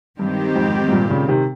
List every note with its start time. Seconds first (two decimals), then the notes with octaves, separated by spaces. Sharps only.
0.19 G2 D#3 G#3 C4 G4
0.56 F2 G#2
0.88 G#2
0.92 G2 A#2
1.10 A#2 C#3
1.28 C3 D#3